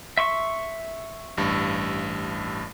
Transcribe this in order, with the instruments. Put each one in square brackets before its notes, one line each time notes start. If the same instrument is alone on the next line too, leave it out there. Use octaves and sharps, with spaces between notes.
[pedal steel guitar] E5 C6 C#6
[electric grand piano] A1 G2